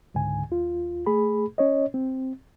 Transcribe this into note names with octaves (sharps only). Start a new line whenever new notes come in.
C#2 G#2 D3 G#5
D#2 F4
A3 G#4 B5
C#4 C#5 D#5
C4